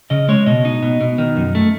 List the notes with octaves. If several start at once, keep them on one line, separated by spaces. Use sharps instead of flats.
C#3 D#5
G#3 C#5
B2 D#5
D#4
B2
B2
D#3
F#2
A3